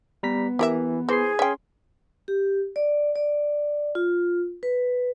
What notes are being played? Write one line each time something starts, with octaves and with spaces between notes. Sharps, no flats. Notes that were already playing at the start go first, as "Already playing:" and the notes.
G3 B3 A#5 B6
E3 G4 A#4 E5
E3 G#4 C5 C6 C7
C#4 E5 G5 C6
G4
D5
D5
F4
B4